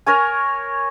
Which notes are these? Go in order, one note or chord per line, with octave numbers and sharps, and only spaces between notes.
A#4 C#5 G#5